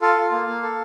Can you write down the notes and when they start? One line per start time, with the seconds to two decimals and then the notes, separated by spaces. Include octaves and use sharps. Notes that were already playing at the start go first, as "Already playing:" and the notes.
0.01 F4 A4 F5
0.17 F4
0.32 A#3
0.47 A#3
0.63 A4